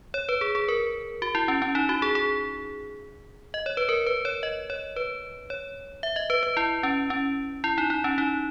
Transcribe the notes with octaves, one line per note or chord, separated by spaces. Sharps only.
C#5
B4
G#4
G#4
A#4
F#4
E4
C#4
C#4
D#4
F#4
G#4
G#4
D#5
C#5
B4
A#4
B4
C#5
D#5
C#5
B4
C#5
E5
D#5
B4
B4
E4
C#4
C#4
E4
D#4
D#4
C#4
D#4